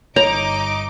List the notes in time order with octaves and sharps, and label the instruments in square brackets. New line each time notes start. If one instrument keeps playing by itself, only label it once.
[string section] G1 D#4 D6 [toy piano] C#5 [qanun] A#5